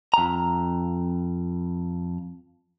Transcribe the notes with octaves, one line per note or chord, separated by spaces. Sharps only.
F2 A#5